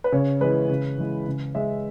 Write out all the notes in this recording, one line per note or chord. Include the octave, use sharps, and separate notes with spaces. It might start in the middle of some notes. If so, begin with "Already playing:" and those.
B4
C#3 C#5
E3 G#3 B4
C#3
E3 G#3
C#3
G#3 E5